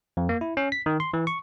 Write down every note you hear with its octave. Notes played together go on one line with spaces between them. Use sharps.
F2
A#3
E4
C#4
B6
D#3
C6
E3
C#6